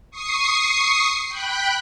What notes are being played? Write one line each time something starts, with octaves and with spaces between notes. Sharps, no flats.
C#6 D#6 C7
G5 B5 F#6